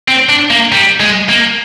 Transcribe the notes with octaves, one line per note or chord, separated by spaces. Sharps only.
C4
D4
A#3
G3
G#3
A#3